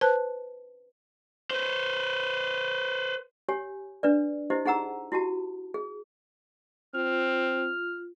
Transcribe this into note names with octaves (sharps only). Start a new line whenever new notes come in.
B4 C5 A5 F#6
B4 C5
G4 C#5 G#5
D4 B4 D5
E4 G4 C5 D#5
D#4 G#4 F#5 A#5 E6
E4 F#4 G4 A5
G#4
C4 F4 F6